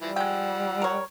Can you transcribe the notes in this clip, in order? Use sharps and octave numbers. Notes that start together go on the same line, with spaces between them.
E3 F3 G3 E4
F3 G#3 F#5 G5 E6
A#4 C#5